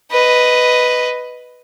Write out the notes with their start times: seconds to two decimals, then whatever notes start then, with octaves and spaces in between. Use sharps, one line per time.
0.12 B4 D#5